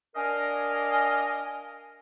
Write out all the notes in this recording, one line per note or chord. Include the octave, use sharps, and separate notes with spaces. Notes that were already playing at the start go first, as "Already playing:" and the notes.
D4 A#4 D#5 F5 G#5